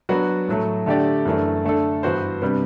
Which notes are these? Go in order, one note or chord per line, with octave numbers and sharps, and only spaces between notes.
F#3 B3 D4 F#4
A2 F#3 A3
D3 A3 D4 G4 D5
F#2 E3 A3 D4
D3 A3 D4 A4
G2 E3 B3 F#4 C5
C3 G3 B3 D4